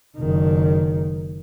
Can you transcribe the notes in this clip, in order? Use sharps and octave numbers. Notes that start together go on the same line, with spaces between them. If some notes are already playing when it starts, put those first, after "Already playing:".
F#1 D#3